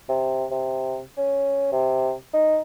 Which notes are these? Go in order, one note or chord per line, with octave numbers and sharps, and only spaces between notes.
C3
C3
C#4
C3
D#4